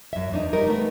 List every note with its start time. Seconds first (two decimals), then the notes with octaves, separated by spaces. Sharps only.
0.13 F#2 E5
0.32 E2 D4 D#4
0.53 G3 C#4 D#4 A#4
0.67 A3 B3